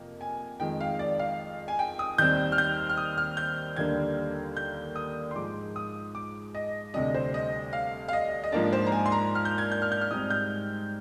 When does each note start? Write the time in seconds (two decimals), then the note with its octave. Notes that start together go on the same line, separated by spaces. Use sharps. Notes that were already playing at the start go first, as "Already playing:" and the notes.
Already playing: F2 C3 A#3
0.21 G#5
0.60 F2 D#3 G#3 G5
0.80 F5
0.99 D5
1.19 F5
1.68 G#5
1.79 G5
1.99 D#6
2.18 D#2 D#3 G3 C4 G6
2.52 F6
2.58 G6
2.89 F6
2.97 D#6
3.18 F6
3.37 G6
3.76 D#2 D3 G3 A#3 D4 G#6
4.57 G6
4.96 D#6
5.31 C6
5.35 G#2 F3 G#3 D6
5.76 D#6
6.15 D6
6.55 D#5
6.94 D2 C3 G3 D4 D#5
7.14 C5
7.34 D#5
7.73 F5
8.08 F5
8.13 D#5
8.44 D#5
8.52 G#2 F3 A#3 D4 D5
8.73 C5
8.87 A#5
8.92 G#5
9.06 C6
9.12 A#5
9.35 F6
9.45 G6
9.58 G#6
9.72 G6
9.82 F6
9.92 G6
10.01 F6
10.11 G#2 G3 C4 D#6
10.30 G6